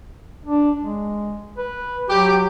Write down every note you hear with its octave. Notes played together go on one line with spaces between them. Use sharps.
D4
G#3
B4
F#3 G4